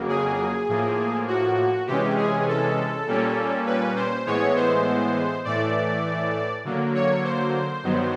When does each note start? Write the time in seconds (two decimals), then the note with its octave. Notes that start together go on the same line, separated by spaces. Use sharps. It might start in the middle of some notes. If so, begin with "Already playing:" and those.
Already playing: F2 C#3 F#3 A#3
0.09 G#4
0.68 A2 F3 A#3
1.28 F#4
1.87 C3 E3 G#3 C#4 G4
2.17 G#4
2.48 A4
3.06 A#2 G3 A#3 C#4
3.66 B4
3.96 C5
4.26 A2 E3 G#3 B3 C#5
4.56 C5
5.45 A2 E3 A3 D5
6.65 D3 F#3 A#3
6.95 C#5
7.24 C5
7.84 G2 D#3 F#3 B3